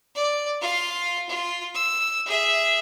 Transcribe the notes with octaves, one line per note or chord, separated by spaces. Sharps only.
D5
F4 F5
F4
E6
G#4 E5